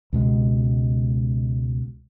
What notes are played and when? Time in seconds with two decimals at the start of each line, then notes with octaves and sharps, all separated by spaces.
0.13 C#2 B2 G#3